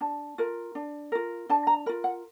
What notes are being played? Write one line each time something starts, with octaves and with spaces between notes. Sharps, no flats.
D4 A5
F4 A#4
D4
F4 A#4
D4 A5
A#5
F4 A#4 B5
F#5